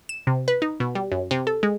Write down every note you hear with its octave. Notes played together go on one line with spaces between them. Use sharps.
E7
C3
B4
D#4
B2
G3
F#2
C3
A4
G#3